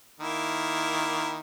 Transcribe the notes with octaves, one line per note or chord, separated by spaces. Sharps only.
D#3 A#3 E4